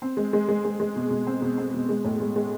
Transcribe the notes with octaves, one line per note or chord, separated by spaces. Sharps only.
C4
G#3
G#3
G#3
G#3
G#3
B2
B2
C4
B2
C4
B2
G#3
A2
G#3
G#3